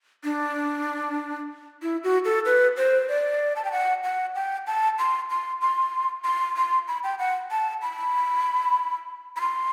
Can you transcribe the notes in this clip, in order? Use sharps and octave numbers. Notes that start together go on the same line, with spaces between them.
D4
E4
F#4
A4
B4
C5
D5
A5
G5
F#5
F#5
G5
A5
C6
C6
C6
C6
C6
B5
G5
F#5
A5
B5
B5
C6